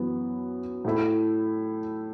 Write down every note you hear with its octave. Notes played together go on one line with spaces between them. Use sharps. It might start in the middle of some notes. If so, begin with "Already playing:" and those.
Already playing: F#2 E3 B3
A2 A3 E4